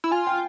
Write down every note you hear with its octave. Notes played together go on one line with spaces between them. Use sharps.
E4
F4 G#5
G5